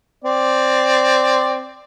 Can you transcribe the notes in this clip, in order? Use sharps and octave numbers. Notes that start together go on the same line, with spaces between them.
C4 D5